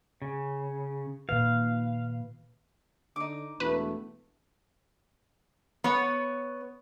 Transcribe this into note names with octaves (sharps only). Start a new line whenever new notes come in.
C#3
A#2 D#3 B4 F5
D3 D#4 D6
E1 A3 B4
B3 C#5